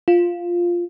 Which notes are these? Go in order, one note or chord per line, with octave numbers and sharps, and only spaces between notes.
F4